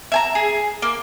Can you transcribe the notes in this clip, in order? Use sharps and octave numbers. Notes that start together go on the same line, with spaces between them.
E5 G#5 A#5
G#4
A#3